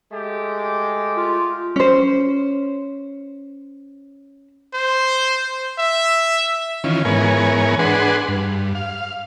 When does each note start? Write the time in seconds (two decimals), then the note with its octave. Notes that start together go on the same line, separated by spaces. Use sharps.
0.12 G#3 A3 G4
1.17 F4
1.76 C#4 C5
4.74 C5
5.78 E5
6.84 D#3 E3 C#4 F4
7.05 G#2 E3 B3 A#4 C#5 G#5
7.79 D4 G#4 B4 F#5 C6
8.28 G2
8.75 F5